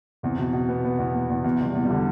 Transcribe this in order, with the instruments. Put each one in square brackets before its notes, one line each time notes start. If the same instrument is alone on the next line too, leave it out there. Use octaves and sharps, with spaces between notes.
[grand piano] E2 [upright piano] C3
[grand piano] B2
B2
B3
B3
E2
B3
E2
[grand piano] E2 [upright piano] B2
[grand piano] E2 [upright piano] G3
[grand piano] E2
[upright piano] G3
[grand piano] D3